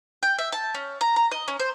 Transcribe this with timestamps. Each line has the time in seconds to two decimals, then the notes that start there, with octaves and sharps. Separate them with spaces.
0.23 G5
0.39 E5
0.52 A5
0.74 C#4
1.01 A#5
1.16 A#5
1.31 D#5
1.48 C#4
1.59 C5